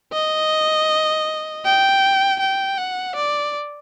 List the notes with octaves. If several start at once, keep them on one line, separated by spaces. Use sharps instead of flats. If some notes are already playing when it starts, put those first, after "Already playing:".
D#5
G5
G5
F#5
D5